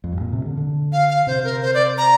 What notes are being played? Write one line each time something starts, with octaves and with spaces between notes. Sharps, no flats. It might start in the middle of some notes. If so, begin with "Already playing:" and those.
F2
G2
A#2
C3
D3
D3
F5
F5
C3 C5
A#4
C5
D5
A#5